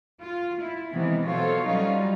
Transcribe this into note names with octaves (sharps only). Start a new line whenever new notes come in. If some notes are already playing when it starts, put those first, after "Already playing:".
F4
E4
C3 D#3 E3 G#3 B3
B2 F#3 F4 A4 C5 C#5
F#3 G3 C#4 D#4 F4